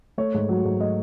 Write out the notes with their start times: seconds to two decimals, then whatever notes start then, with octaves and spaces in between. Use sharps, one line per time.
0.18 A3 C#5
0.34 G#2
0.49 F#3
0.65 G#2
0.80 A3 D#5